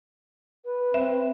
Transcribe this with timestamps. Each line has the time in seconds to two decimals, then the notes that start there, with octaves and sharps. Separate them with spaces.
0.65 B4
0.94 C4 E5